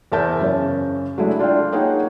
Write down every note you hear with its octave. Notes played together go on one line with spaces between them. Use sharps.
E2 A#4 C5 E5 A5 G6
F#2 C#3 C#4
F#3 G#3 A3 D4 E4
D4 F4 D5 F5 G5
A#3 D#4 G#4 C#5 F#5 G5